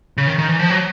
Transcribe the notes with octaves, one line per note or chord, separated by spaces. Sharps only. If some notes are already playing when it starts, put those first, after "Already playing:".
C#3
D#3
D#3
E3
F3
F#3